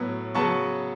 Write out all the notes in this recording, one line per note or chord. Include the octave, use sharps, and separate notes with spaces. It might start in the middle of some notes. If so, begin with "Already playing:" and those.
Already playing: A2 F#3 B3
C#3 F#3 B3 A5 C#6